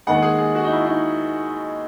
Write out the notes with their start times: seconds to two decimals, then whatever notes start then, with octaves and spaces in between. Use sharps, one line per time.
0.07 D#2 D#3 G#3 F#5
0.23 G#4
0.38 G#4
0.55 F#4
0.64 D#4
0.71 E4
0.86 D#4